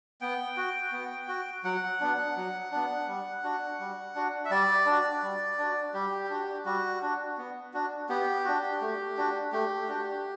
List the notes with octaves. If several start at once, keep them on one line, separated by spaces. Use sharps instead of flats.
B3 G5
F#4
B3
F#4
F#3 F#5
B3 D4
F#3
B3 D4
G3
D4 F#4
G3
D4 F#4
E5
G3 D5
D4 F#4
G3
D4 F#4
G3 G4
D4 F#4
G3 F#4
D4 F#4
B3
D4 F#4
B3 G4
D4 F#4
A3
D4 F#4
A3 G4
D4 F#4